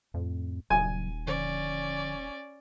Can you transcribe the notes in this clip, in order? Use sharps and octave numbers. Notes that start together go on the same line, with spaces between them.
F2 A2
D#1 C#3 F#3 G#5
D3 F3 C#4 D5